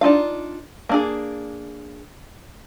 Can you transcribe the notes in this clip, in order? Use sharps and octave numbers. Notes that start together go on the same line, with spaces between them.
D4 D#4 F4 F5
A#3 D4 G#4